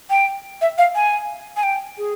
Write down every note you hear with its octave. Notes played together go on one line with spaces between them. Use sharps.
G5
E5
F5
G#5
G#5
G5
G#4